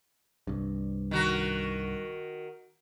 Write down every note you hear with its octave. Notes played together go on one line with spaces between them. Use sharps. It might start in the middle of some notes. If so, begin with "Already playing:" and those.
C2 G2
D#3 F#4 A#4